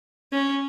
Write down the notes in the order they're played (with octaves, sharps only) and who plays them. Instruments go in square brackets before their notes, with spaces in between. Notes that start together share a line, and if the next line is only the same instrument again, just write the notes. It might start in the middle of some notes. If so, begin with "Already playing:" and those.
[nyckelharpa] C#4